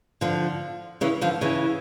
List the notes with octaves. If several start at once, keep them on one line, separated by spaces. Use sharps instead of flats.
D3 F3
C#3 E3
D3 F3
C#3 E3